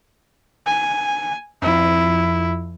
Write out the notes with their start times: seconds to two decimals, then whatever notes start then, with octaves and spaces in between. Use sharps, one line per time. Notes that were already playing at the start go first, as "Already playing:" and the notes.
0.66 G#5
1.62 F2 F3 E4